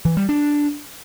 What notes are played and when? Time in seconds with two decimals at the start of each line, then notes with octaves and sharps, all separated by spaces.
0.05 E3
0.17 G3
0.29 D4